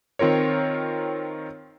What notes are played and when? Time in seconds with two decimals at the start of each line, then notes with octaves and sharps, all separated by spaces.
0.19 D#3 C4 F4 A#4 C#5